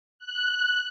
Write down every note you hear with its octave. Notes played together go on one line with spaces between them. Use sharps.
F#6